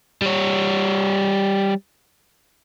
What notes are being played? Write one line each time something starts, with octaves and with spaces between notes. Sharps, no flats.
G3 C#5